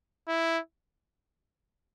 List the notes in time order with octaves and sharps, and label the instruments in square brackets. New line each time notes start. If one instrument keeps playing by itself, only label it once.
[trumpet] E4